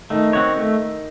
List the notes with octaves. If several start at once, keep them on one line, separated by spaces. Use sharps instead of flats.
D#3 A3 D#4
C4 F#4 C#5
A3